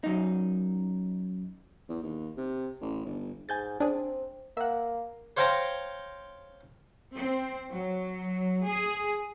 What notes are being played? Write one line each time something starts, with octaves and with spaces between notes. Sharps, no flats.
F#2 D#4
E2
D#2
C3
A1
G1
G#2 G#5 G6 A6
C4 D4 G#4
A#3 E5 F#5
C5 C#5 F5 G5 A5 A#5
C4
F#3
G#4